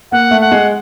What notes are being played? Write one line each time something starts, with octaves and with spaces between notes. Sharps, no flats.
A#3 F#5
A3
F#5
G#3